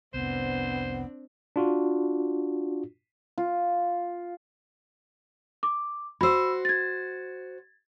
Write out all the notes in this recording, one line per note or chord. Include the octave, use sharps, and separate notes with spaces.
F1 C2 B3 C4 D4 C5
D4 F4 F#4
F4
D6
F#4 C5 B5 E6
G#6 A6